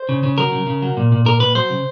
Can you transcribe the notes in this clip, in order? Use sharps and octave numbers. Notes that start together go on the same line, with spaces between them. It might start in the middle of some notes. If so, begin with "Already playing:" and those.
Already playing: C5
C#3
C#3
F#3 A#4
C#3
C#3
F#3
A#2
A#2
A#2 A#4
A#2 B4
F#3 C5
C#3